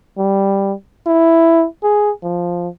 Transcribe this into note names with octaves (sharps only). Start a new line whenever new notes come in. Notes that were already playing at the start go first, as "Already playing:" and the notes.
G3
E4
G#4
F3